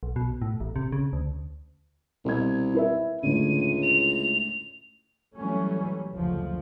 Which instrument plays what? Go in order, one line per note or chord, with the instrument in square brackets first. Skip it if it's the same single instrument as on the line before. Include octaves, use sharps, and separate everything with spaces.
[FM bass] B1
B2
A2
A1
C3
C#3
D2
[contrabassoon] C2 [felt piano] B2 G#6
[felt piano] E4 B4 E5
[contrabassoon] C#2 [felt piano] A2 D3 [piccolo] D#7
[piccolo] F7
[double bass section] E3 F#3 G3 A3 C#4
F#1 D2 F3